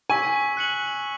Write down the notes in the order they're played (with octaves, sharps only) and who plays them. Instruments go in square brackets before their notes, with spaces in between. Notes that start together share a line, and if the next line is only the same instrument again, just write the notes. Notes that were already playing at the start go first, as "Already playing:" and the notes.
[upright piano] G#5 [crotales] C#6 E6 B6
[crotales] F#6 C#7 F#7